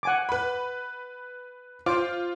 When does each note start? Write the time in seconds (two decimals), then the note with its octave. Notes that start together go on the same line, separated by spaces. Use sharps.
0.03 F#5 G#5 D6
0.29 B4 B5
1.86 F4 C5 D6